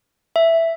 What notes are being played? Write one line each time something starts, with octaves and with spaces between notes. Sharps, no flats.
E5